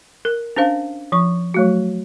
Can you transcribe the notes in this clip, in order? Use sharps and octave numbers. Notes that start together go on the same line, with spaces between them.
A#4
C#4 D4 C5 F5
F3 C#6
F#3 A3 F#4